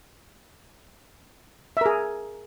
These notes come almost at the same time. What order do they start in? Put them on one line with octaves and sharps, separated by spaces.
E5 A#4 G#4